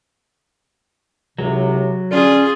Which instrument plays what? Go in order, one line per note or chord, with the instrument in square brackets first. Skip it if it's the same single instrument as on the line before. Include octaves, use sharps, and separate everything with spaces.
[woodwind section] C#2 A2 C3 [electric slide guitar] F#3
[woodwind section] D3 C#4 [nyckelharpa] F4 G#4